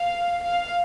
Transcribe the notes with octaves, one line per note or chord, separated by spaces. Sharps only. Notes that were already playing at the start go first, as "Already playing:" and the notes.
Already playing: F5
F5